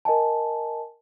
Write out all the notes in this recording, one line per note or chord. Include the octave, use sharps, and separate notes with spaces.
A#4 D#5 G#5 A5